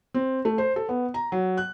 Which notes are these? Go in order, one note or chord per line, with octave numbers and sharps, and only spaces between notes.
C4
A3
C5
A4
B3
A#5
F#3
F#6